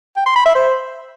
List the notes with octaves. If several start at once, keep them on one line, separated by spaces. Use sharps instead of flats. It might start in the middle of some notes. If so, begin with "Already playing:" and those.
G5
C6
B5
E5
C5